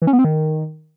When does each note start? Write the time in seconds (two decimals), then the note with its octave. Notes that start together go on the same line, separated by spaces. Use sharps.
0.02 E3
0.07 C#4
0.13 B3
0.19 C4
0.24 D#3